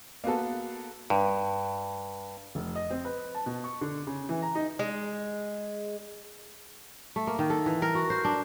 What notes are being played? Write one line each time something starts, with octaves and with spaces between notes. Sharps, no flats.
A#3 B3 F#4 A4
G2
F1
D#5
C4
B4
A5
B2
C#6
D3
C#3
E3
A#5
D#4
G#3
A3
A#3
D#3
A4
E3
A#4
F#4
C5
D4